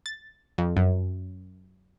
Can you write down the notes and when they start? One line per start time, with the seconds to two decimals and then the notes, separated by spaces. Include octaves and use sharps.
0.06 A6
0.58 F2
0.77 F#2